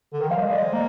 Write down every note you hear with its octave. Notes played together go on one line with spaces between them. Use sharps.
D3
D#3
F3 F5
G3
G#3 D#5
D5
C5
A#3